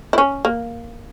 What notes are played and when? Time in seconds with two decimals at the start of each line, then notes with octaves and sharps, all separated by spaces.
0.13 E4
0.18 C#4
0.45 A#3